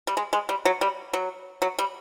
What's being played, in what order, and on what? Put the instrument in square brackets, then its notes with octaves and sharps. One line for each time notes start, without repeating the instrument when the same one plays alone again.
[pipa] G3
G#3
G#3
G3
F#3
G3
F#3
F#3
G3